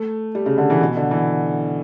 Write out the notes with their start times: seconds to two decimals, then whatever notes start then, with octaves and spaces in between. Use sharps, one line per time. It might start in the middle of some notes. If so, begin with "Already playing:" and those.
Already playing: A3
0.35 G3
0.46 C#3
0.58 D3
0.70 E3
0.81 B2
0.97 D3
1.11 E3